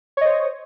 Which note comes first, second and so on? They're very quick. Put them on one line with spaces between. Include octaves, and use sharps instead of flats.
C#5 D#5 C5